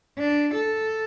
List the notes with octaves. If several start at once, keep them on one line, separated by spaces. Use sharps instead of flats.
D4
A4